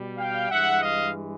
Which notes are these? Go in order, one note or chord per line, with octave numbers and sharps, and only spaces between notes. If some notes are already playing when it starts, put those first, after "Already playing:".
Already playing: B2 G3
F5 G5
G2 E3 G#3 E5 F#5
D#5 F5